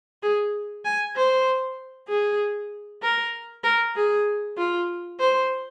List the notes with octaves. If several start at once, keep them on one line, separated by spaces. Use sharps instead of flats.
G#4
G#5
C5
G#4
A#4
A#4
G#4
F4
C5